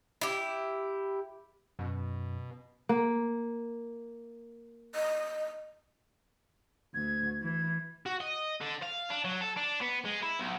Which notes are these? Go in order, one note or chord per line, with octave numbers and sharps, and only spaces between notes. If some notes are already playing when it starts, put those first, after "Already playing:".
E4 G4
F#2 B2
A#3
D#5
D2 G#6
E3 G#6
F#4
D#5
D3
F5
D4
F#3
A4
D4
B3
G#3
E4
B1